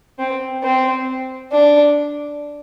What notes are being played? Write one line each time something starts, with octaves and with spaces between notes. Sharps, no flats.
C4
C4
D4